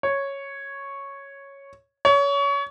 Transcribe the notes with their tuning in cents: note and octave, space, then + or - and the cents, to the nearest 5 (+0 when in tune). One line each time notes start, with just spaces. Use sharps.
C#5 -5
C#5 +25